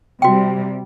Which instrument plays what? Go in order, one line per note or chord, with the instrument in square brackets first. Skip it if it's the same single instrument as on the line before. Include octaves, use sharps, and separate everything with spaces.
[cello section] C3 G3 [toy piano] F#4 G5